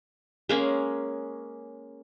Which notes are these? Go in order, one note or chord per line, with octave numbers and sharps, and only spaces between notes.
G#3 A#3 C#4